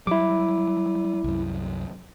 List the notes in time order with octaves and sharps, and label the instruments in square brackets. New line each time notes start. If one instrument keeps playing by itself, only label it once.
[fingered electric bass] F#3 G3 [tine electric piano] E4 D6
[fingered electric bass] C2 F#2